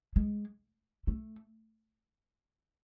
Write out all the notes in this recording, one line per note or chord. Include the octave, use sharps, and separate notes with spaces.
G#3
A3